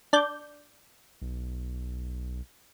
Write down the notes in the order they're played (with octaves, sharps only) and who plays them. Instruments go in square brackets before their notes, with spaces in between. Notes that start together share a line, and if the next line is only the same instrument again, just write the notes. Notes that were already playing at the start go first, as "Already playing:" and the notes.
[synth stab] D4 D5 G6
[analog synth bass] B1